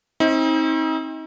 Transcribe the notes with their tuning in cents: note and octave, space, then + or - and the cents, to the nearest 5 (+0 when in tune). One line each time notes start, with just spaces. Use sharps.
C4 +30 D#4 +40